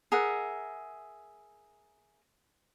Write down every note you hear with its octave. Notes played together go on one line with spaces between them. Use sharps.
G#4 A#4 E5 F#5